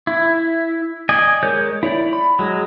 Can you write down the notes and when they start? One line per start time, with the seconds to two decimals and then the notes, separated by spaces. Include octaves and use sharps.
0.07 E4
1.09 D5 D#5 G#5
1.43 G#3 A#4 C#5 G6
1.83 E4 C#5 D5
2.13 B5
2.39 F#3 G#3